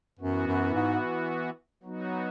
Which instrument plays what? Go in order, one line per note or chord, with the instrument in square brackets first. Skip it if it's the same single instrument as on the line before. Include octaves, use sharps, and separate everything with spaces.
[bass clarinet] F#2 [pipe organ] E3 B3 F#4
[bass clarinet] F#2
G#2
[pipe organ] F#3 B3 D#4 F#4